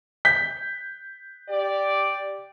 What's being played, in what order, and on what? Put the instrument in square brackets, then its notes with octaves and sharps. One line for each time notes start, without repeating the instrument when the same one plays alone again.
[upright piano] G6 B6
[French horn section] G4 D5